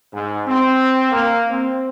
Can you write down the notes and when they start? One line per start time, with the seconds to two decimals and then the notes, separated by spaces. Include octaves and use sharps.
0.12 G#2
0.46 C4
1.11 A#3
1.49 C4